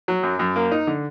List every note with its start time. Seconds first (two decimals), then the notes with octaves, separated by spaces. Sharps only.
0.08 F#3
0.23 F#2
0.39 F#2
0.56 A#3
0.72 D#4
0.87 D3